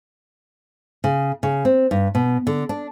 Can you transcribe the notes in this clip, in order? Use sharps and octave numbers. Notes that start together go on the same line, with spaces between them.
C#3
C#3
C4
G2
B2
D3
D4